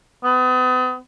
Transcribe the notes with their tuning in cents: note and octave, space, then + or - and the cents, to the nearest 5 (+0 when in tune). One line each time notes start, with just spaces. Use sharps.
B3 +40